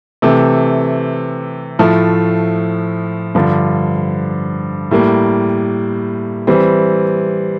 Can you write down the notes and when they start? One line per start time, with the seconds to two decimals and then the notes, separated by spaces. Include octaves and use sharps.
0.22 C3 E3 A3
1.79 A2 F3 A3
3.35 G2 D3 F3
4.91 A2 G3 A#3
6.47 E3 G3 C4